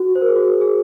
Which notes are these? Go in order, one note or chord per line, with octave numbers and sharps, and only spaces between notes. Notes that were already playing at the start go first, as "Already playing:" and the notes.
Already playing: F#4
C5
A#4
G#4
F#4
G#4